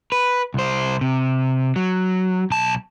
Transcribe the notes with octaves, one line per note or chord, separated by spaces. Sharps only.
B4
C2 C5
C3
F#3
B1 A5